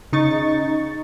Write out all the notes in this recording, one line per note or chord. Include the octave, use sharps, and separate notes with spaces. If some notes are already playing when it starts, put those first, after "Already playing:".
C#3 D#4 C#6 A6